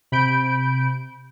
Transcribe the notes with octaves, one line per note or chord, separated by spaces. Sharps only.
C3 B5 G6 D7